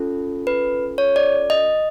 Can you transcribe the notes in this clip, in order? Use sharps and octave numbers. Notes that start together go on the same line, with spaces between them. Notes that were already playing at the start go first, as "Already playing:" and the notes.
Already playing: C#4 F4 A4
B4
C#5
D5
D#5